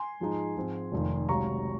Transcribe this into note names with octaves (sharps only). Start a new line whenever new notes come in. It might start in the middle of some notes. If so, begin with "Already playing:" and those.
Already playing: G#5 C6
G#2 F3 G#3 D#4
G#2 F3 G#3 C4 F4
F1 F2 D#3
C#2 C3 F#3 A#5 C#6